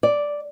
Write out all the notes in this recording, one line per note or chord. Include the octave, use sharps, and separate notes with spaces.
D5